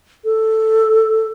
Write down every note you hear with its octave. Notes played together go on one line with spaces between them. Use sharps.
A4